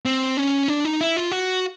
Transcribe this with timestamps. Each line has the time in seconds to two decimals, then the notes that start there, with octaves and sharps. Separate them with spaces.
0.05 C4
0.37 C#4
0.68 D4
0.85 D#4
1.01 E4
1.16 F4
1.32 F#4